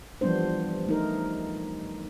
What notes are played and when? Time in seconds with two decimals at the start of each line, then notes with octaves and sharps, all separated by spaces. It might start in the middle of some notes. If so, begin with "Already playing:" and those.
0.21 E3 F3 G3 B3 D4 C5
0.87 A3 D#4 A#4